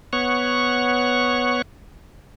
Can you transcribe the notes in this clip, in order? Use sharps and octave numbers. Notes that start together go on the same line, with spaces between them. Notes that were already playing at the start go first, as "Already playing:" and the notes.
B3 C#5 F#5 C#6